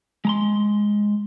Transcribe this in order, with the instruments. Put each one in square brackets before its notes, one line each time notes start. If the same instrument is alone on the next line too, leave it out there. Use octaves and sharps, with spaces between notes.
[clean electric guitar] G#3 A#5 C6